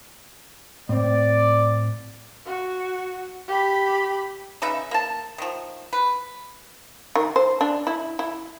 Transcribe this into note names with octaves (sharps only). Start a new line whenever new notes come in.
A2 C4 D5
F#4
G4 B5
C#3 D#4 B4 E5
A#3 A5
D#3 F3
B4
D#3
C5
D4
E4
E4